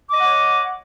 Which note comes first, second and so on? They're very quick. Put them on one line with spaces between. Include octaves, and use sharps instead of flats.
D6 D#5 F#5 C#5